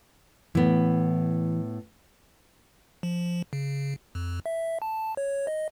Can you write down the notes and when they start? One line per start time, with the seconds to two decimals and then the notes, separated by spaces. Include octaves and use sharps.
0.55 A2 E3 B3
3.03 F3
3.53 C#3
4.15 F2
4.46 E5
4.82 A5
5.17 C#5
5.47 D#5